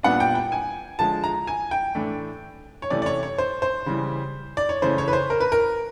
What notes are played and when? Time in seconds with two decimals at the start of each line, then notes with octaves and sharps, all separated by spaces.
0.03 A#2 G3 B3 D4 F#5
0.20 G5
0.35 G5
0.52 G#5
0.99 D3 F3 G#3 A5
1.24 A#5
1.47 G#5
1.71 G5
1.95 A2 E3 A3 D4
2.82 C#5
2.90 C3 E3 A3 C#4 D5
3.02 D5
3.06 C#5
3.23 C#5
3.38 C5
3.62 C5
3.86 C#3 E3 G3
4.57 D5
4.69 C#5
4.82 C#3 E3 A3 C#4 C5
4.98 C#5
5.08 B4
5.13 C5
5.30 A#4
5.40 B4
5.52 A#4